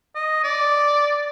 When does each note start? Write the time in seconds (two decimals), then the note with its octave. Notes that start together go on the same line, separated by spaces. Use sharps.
0.15 D#5
0.44 D5